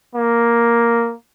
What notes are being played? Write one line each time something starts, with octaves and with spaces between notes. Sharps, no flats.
A#3